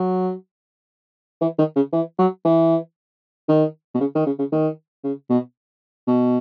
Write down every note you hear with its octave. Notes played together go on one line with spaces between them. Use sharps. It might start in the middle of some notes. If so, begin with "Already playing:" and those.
Already playing: F#3
E3
D#3
C#3
E3
F#3
E3
D#3
B2
C#3
D#3
C#3
C#3
D#3
C#3
B2
B2